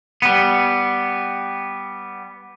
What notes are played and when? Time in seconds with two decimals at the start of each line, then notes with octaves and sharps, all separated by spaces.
0.22 G3 B3